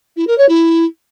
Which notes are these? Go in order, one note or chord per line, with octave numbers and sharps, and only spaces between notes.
E4
A#4
C#5
E4